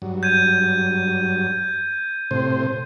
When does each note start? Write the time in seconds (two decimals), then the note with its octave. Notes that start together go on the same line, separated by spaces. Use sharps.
0.02 G2 F#3
0.23 G6 G#6 D#7
2.31 A2 C3 C5